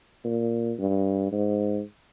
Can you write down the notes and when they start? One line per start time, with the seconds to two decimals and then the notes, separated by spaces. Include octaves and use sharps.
0.24 A#2
0.79 G2
1.32 G#2